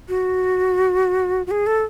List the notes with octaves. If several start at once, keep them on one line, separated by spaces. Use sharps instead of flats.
F#4
F#4
G#4
A4